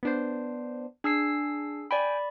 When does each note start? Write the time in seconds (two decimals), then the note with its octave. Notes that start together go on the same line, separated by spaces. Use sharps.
0.03 B3 D4 C5
1.04 D4 G#4 E6 C7
1.91 D5 G5 G#5 B5